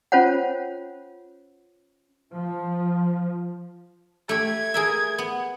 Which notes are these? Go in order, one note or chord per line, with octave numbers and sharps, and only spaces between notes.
C#4 F4 C5 C#5 F#5
F3
A3 G4 G#6
G#4 A#4 E5
B3